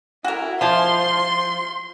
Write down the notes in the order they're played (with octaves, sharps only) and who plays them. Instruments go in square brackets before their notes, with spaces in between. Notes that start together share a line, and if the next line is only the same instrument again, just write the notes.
[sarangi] E4 [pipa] F#4 A#4
[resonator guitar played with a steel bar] F3 [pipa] E4 A5 [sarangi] C6